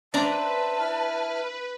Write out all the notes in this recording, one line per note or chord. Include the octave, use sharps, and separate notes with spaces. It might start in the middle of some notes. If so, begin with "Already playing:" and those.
D4 B4 C5 D5 E5 A5 A#5
E4 F6